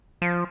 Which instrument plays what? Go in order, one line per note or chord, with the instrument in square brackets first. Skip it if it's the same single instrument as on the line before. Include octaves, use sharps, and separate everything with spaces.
[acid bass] F3